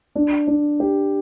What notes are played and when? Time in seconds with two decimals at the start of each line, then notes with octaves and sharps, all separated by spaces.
0.15 D4
0.47 D4
0.80 G4